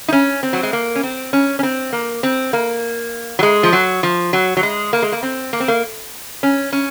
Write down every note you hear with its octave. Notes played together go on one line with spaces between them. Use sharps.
D#4
C#4
C4
F#3
G#3
A#3
C#4
C4
C#4
C#4
C4
A#3
C4
A#3
F#3
G#3
F3
F#3
F3
F#3
F#3
G#3
A#3
G#3
A#3
C4
A#3
C4
A#3
C#4
C#4